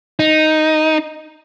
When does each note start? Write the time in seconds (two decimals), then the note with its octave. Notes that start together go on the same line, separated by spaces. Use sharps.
0.19 D#4